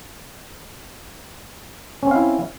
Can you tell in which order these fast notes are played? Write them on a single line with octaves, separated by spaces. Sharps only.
C#4 C4 F5 E4